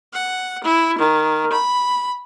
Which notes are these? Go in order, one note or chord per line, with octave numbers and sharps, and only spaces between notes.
F#5
E4
D#3
B5